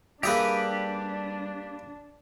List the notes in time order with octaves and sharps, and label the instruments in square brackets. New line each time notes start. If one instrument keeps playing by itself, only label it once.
[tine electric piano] G3 [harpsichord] A#3 G#4 E5 [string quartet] D4 [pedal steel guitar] G4 B4